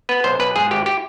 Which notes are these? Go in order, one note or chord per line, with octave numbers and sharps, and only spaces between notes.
B3 B4
B1 C5
B1 B4
G#2 G#4
G#1 G4
G4